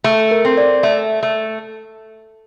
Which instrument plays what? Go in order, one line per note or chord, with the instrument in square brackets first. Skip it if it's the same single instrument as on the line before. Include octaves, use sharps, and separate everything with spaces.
[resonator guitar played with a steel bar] A3 [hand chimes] A4
[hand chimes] A#4
[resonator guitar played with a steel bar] C4
[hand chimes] D5
[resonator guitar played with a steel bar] A3 [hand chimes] E5
[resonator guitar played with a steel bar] A3